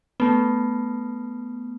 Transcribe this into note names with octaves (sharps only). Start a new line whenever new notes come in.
A3 B3